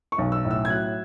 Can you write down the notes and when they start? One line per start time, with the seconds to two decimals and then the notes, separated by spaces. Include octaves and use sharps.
0.12 C#6
0.18 B1
0.32 E6
0.45 A2
0.51 E6
0.65 G#6
0.70 F#3 F#6